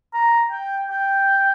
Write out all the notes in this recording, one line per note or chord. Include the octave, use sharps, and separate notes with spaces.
A#5
G5
G5